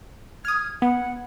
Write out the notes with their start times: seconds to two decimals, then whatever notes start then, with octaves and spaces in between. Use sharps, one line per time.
0.45 D#6 F6 G#6
0.82 B3 F#5